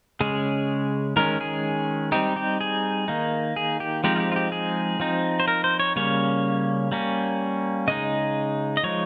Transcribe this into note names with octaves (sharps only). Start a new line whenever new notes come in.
C#3 G#3 C#4 G#4
D#3 G#3 C#4 A#4
G#4
G3 C4 D#4 G4
G4
G#4
D#3 A#3 D#4
G#4
G4
F3 G#3 C4 D#4 G4
F4
G4
F4
G4
G#4
F3 C4 D#4
C5
A#4
C5
C#5
C#3 G3 A#3 C#4 C#5
G3 A#3 C#4
C#3 G#3 D#4 D#5
D#5
F3 G#3 D#4 C#5